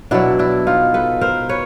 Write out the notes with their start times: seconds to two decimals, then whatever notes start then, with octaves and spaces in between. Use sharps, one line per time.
0.11 B2 F#3 D4 E4
0.39 D4 E4
0.67 D#4 F4
0.94 A4 B4
1.21 A#4 C5
1.49 B4 C#5